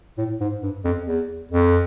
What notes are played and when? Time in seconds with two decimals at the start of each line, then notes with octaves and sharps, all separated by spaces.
0.18 A2
0.41 G#2
0.63 G2
0.85 F2
1.07 E2
1.51 F2